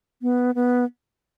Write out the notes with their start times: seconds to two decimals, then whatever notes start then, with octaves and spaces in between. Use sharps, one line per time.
0.22 B3
0.55 B3